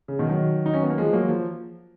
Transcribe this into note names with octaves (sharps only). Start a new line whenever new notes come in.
C#3
B2 D#3
D#3 F#3
D#4
C#4
B3
A#3
F3 G#3
F#3 A#3
F3